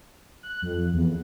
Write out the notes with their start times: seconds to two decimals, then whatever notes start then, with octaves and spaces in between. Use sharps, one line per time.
0.43 F#6
0.62 F2
0.93 E2